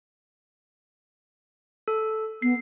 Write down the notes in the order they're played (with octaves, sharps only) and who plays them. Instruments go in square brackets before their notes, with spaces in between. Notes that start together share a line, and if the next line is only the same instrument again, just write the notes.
[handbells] A4
[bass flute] B3 [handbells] C7